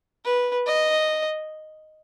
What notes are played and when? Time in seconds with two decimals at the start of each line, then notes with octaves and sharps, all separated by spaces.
0.25 B4
0.66 D#5